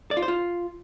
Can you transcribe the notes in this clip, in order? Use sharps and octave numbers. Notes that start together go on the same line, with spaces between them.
D5
F4
C5
F4